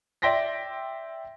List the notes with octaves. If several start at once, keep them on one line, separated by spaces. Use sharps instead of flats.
D5 E5 G5 C6 A#6 B6